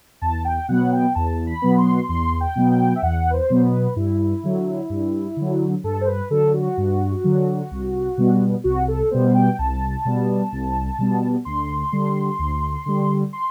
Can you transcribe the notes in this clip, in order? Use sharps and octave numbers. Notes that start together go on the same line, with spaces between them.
E2 A5
G5
B2 F#3 B3 F#5
G5
E2 A5
B5
B2 F#3 B3
C6
E2 C6
G5
B2 F#3 B3
G5
E5
E2 F#5
B4
C5
B2 F#3 B3
B4
G2 E4
D3 F#3
G2
D3 F#3
G2 A4
C5
B4
D3 F#3 A4
F#4
G2
D3 F#3
C2
B2 G3 B3
C2 F#4
A4
B2 G3 B3 C5
G5
C2 A5
B2 G3 B3
C2
B2 G3 B3
D2 C6
D3 G3
D2
D3 G3
C6